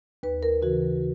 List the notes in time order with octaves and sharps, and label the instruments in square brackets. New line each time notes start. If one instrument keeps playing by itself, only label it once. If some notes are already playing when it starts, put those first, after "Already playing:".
[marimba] D#2 B4
A#4
C#3 E3 F#4